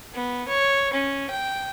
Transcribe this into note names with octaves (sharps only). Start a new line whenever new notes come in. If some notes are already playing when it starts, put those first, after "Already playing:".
B3
C#5
C#4
G5